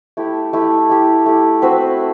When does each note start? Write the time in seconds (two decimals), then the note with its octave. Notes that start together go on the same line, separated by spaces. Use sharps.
0.17 A3 E4 G4
0.53 A3 E4 G4
0.89 A3 E4 G4
1.26 A3 E4 G4
1.62 C4 F#4 B4 E5